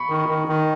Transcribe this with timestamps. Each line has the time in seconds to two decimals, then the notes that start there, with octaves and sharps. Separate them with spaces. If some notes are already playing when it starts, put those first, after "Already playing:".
Already playing: B5 C#6
0.10 D#3
0.29 D#3
0.48 D#3